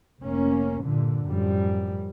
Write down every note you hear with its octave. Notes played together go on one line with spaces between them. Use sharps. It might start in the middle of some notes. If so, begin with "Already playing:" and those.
F1 A#3 C#4
G2 A#2 D3
F#2 A2 F3 G3